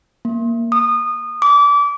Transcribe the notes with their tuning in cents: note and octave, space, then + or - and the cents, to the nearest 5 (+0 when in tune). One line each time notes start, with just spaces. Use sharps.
A#3 +0
D#6 -25
D6 -25